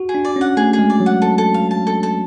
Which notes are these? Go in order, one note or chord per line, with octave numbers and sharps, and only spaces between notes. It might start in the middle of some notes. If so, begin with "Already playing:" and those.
Already playing: F#4
G#4
D4
D5
C#4 F#5
A3 G#4
G#4
G#3
D5
F#3
F#5
A4
A4
F5
A5
A4
A4